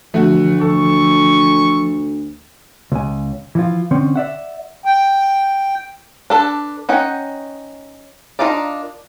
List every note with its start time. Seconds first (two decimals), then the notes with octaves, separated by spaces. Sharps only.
0.14 D2 D3 E3 F3 A3 F#4
0.61 A4 C#6
2.92 C#2 G#5
3.55 E3 F3 F4
3.91 D3 C4 C#4
4.15 D5 E5 F#5
4.85 G5
6.30 D4 A4 B4
6.89 C#4 D#4 F#5 G5
8.39 D4 D#4 F4 A#4 D5